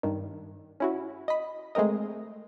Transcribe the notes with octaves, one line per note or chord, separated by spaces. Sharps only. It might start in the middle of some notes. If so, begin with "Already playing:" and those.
G2 D#3
C#4 E4 F#4
D#5 B5
G#3 A3 C4 A#4 D#5